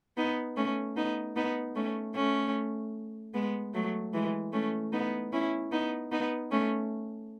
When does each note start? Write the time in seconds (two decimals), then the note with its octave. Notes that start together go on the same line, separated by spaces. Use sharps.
0.17 B3 D#4
0.57 A3 C#4
0.96 B3 D#4
1.36 B3 D#4
1.76 A3 C#4
2.15 A3 C#4
3.34 G#3 B3
3.74 F#3 A3
4.13 E3 G#3
4.53 A3 C#4
4.92 B3 D#4
5.33 C#4 E4
5.72 B3 D#4
6.12 B3 D#4
6.51 A3 C#4